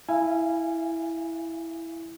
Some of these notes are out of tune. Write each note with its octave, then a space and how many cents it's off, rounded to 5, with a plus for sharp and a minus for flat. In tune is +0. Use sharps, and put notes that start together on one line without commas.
E4 +0 F5 -30 G#5 -5